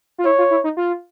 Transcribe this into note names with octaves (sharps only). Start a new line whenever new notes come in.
F4
E4 C#5
F4
E4
D#4
F4